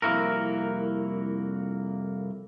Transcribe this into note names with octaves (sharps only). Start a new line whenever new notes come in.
C2 F2 A#3 E4 F#4 A#4